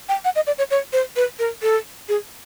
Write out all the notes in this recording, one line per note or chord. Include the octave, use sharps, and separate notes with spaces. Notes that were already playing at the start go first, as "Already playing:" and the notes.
G5
F#5
D#5
D5
C#5
C#5
C5
B4
A#4
A4
G#4